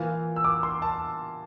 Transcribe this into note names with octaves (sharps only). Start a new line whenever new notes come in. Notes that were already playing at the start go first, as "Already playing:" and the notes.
Already playing: E3 A#3 F4
E6
D6
C6
A5